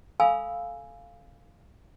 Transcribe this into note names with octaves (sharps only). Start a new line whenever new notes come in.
A4 F5 G#5 B5 E6